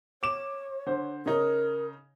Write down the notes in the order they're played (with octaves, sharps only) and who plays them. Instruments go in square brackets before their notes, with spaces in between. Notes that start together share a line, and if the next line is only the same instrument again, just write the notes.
[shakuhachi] C#5 [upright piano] D6 E7
[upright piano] D3 C5
[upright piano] C#3 C#4 D#4 [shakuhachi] A#4